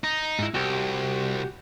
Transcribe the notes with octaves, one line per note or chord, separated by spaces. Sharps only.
D#4
G#2 E4
C2 F#4 G4